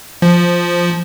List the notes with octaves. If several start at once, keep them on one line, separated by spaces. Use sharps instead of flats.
F3